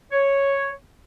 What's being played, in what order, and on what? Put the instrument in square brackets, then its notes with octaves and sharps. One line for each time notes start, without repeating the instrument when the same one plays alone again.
[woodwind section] C#5